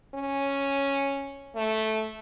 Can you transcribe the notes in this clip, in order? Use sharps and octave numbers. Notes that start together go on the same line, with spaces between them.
C#4
A3